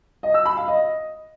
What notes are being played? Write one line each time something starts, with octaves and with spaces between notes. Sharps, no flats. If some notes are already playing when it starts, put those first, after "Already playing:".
D#5
E6
B5
F5
D#5